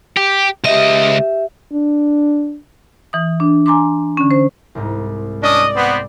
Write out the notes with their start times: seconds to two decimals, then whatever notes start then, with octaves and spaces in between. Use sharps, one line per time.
0.17 G4
0.64 C#2 G4 D#5 E5
1.73 D4
3.13 E3 D#6
3.40 D4
3.66 G#5 A#5 C6 D6
4.17 D3 C#4
4.31 C5
4.75 C2 G#2
5.43 C#4 D4 D5 D#5 D#6
5.76 B3 C4